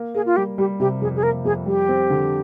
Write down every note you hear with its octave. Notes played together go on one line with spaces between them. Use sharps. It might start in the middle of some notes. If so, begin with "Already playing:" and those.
Already playing: A#3
A#3 G#4
F4
G3 G4
G3 G4
C3 G4
F2 G#4
G#4
A#3 A#4
F2 G#4
G3 G4
C4
D3